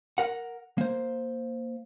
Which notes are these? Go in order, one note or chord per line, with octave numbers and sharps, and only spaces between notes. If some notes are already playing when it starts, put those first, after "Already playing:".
A#4 F#5
A#3 C5